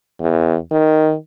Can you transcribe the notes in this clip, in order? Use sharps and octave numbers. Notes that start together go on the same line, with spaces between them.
E2
D#3